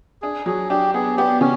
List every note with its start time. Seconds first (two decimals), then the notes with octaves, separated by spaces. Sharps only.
0.22 D4 G#4
0.46 F#3 G#4
0.70 D4 G4
0.94 B3 G#4
1.17 B3 G4
1.41 C#3 C#4